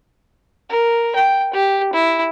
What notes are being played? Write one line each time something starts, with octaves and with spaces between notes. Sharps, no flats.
A#4
G5
G4
E4